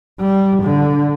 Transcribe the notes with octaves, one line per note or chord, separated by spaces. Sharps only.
G3
D3